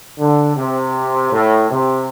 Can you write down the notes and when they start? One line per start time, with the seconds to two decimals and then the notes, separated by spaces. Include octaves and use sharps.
0.18 D3
0.56 C3
1.32 A2
1.71 C3